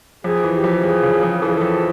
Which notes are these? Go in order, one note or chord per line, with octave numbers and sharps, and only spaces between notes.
F2 G#4
E3
G4
F2
F2 G#4
C#3
F2
E3 A4
G#4
F2 A4